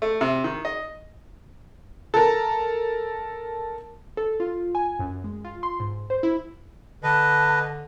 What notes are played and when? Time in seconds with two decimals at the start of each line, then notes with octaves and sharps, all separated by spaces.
0.02 A3
0.21 C3
0.44 D#3
0.65 D#5
2.14 A4 A#4
4.17 A4
4.40 F4
4.75 G#5
4.99 F#2
5.24 G#3
5.45 F4
5.63 C6
5.80 G#2
6.10 C5
6.23 E4
7.03 D3 B4 D#5 A5